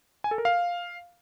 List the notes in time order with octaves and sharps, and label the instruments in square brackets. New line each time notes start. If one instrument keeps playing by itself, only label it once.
[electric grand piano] G#5
A4
A#4
F5